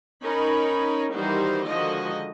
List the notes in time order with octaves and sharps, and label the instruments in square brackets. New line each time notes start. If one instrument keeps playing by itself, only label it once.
[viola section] C#4 D#4 A#4 C#5 B5
D#3 E3 G3 D#4 F#4 C5
D3 D#3 F3 G#3 F#4 D#5